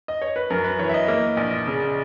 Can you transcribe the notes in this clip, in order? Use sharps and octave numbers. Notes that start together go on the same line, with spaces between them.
D#5
C#5
B4
F#2 A#4
B4
E3 C#5
E5
D#5
A#3
A#1
C#3